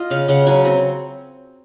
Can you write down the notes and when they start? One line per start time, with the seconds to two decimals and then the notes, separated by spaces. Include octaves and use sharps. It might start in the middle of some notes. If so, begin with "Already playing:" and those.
Already playing: F4 D#5
0.10 C#3 F5
0.28 C#3 F#5
0.47 F#3 G#5
0.64 C4 A#5